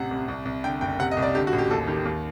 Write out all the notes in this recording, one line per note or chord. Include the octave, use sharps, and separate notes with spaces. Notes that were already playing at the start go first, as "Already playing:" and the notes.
Already playing: A1 C3 F#5
C2
C2
C2
D3 G5
F#1 G5
C3 F#5
D#5
C2
D5
D3 G4
F#4
A1
G4
D#2 A4
D#3 G4
D#2